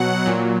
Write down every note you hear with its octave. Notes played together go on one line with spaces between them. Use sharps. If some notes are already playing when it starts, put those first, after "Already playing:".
Already playing: B2 F#3 F#5
A#2 F#3